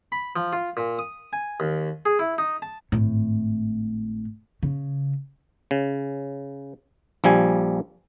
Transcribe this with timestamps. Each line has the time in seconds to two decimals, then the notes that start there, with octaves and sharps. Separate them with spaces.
0.12 B5
0.36 F3
0.53 F4
0.77 A#2
0.99 D#6
1.33 G#5
1.60 D#2
2.06 G#4
2.19 E4
2.38 D#4
2.62 A5
2.92 G#1 A2
4.63 C#3
5.71 C#3
7.24 A#1 F3 G3 G#5